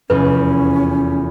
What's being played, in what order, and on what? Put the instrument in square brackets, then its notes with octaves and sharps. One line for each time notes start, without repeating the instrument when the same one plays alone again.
[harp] F1 E2 [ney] C#4 [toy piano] B4